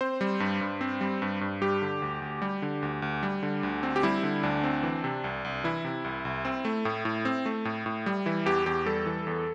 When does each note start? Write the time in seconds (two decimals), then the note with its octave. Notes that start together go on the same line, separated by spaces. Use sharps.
0.01 C4 C5
0.21 G3
0.40 G2
0.61 G2
0.81 C4
1.01 G3
1.22 G2
1.41 G2
1.61 G3 G4
1.82 D3
2.02 D2
2.22 D2
2.42 G3
2.62 D3
2.83 D2
3.02 D2
3.23 G3
3.43 D3
3.63 D2
3.83 C4
3.96 G4
4.03 G3 E4
4.23 D3
4.43 D2 D4
4.64 C4
4.83 E3
5.04 C3
5.24 C2
5.45 C2
5.64 E3 E4
5.85 C3
6.05 C2
6.25 C2
6.45 C4
6.65 A3
6.85 A2
7.05 A2
7.25 C4
7.46 A3
7.65 A2
7.86 A2
8.06 G3
8.26 E3 E4
8.46 E2 G4
8.66 E2 G4
8.86 G3 A4
9.06 E3
9.27 E2